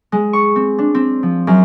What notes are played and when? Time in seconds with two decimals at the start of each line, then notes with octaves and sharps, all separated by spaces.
0.12 G#3
0.33 C#6
0.56 C4
0.78 D4
0.95 C4
1.23 F3
1.47 F#2